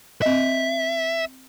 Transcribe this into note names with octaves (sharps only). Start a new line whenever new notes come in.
C4 D#5 E5